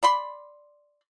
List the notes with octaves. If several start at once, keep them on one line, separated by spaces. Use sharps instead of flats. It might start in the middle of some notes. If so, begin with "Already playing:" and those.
D5 B5 C6